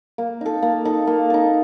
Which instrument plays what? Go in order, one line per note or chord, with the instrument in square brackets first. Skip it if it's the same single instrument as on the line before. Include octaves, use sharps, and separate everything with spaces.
[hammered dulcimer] A#3
D#4 A4
A#3
D#4 A4
A#3
D#4 A4